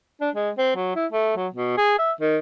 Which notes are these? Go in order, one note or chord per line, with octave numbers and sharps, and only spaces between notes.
D4
G#3
C4
F#3
E4
A3
F#3
B2
G#4
E5
D#3